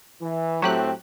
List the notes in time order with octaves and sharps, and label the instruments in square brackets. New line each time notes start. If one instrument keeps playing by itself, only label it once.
[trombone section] E3
[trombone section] A2 A3 C4 [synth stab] F#3 G4 F#6